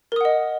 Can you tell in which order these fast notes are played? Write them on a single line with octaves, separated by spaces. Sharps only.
A#4 D#6 F#5 D#5